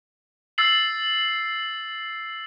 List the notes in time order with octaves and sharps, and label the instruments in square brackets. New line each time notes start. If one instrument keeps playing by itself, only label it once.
[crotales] E6 A6 C7 F#7